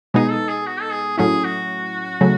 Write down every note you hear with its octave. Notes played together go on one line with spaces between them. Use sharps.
B2 G#3 B3 D#4 G#4
A4
G#4
F#4
A4
G#4
A2 F#3 A3 C#4 E4 G#4
F#4
C#3 F#3 A3